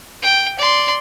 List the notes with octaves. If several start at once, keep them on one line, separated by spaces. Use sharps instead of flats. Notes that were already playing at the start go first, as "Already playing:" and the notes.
G5
D5 C6